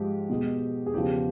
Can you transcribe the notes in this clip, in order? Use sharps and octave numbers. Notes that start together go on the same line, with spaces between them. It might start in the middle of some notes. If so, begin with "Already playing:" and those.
Already playing: G#2 F3 G#3 G4
B2 G#3
G#4
E2 C#3 F3 G4